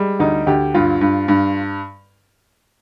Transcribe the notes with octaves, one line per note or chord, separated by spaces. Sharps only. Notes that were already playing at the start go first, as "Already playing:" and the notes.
Already playing: G3 G#3
D2 D#4
D2 G4
G2 F4
G2
G2